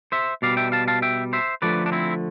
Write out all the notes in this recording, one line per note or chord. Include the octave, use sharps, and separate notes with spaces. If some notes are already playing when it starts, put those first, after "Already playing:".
C5 E5
B2 G3 D5 F5
E5 G5
F5 A5
F5 A5
E5 G5
C5 E5
D3 F3 A3 B4 D5
D4
C4 E4